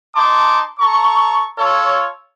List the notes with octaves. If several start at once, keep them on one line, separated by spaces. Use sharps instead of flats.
D#4 A5 C6 D6
A4 A#5 C#6
F4 A4 C#5